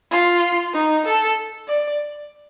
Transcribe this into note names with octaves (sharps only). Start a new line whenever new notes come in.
F4
D#4
A4
D5